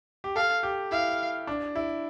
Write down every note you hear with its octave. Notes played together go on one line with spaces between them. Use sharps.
G4
A4 F5
G4
E4 F5
D4
E4